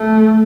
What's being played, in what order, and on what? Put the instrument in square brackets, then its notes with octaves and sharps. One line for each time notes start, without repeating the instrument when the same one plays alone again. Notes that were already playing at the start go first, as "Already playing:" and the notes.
Already playing: [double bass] A3